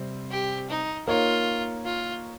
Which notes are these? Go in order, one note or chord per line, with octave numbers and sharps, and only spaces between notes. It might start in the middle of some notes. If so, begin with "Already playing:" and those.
Already playing: C3 G3 C4
G4
D#4
A#3 D#4 F4 A#4 C#5
F4